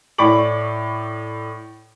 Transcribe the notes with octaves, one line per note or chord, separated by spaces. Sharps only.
A2 D5 B5 C#6 D6 F#7